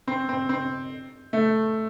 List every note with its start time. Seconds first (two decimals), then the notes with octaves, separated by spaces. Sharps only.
0.07 C4
0.29 C4
0.49 C4
1.33 A3